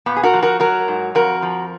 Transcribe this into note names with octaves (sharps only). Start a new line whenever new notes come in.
A#2 B3
G#4
F#4 A#4
F3
F#4 A#4
F#3 F#4 A#4
G#2
F2 F#4 A#4
F3